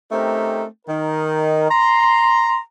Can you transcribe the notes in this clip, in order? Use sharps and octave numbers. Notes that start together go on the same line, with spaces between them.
A3 C4 C#4 D#4 G4 A#4
D#3 D#4 A#4
A#5 C6